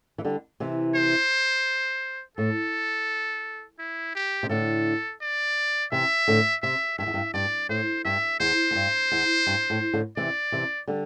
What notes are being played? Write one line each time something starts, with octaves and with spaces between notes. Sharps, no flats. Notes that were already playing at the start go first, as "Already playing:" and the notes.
E3
D3 G3
C3 E3
C5
A2 A4
E4
G4
C3
A2 D3 A4
D5
C3 E3 E5
A2 D3
C3 E5
G2 E5
E2
G2
G2 D5
A2 C5
G2 E5
E2 C5
E2
G2
E2
G2
A2
A2 D3
C3 E3 D5
C3 E3
D3 G3